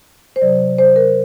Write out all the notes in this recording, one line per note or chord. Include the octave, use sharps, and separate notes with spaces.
C5
C3 F#3 D5
C5
A#4